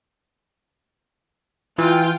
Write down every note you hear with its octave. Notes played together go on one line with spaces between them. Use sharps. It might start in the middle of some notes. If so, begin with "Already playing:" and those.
E3 F4 G5